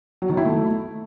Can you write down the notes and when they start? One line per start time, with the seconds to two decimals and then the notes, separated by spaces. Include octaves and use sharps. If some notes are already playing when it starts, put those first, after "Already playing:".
0.22 F#3
0.30 D#3
0.37 E4
0.45 A3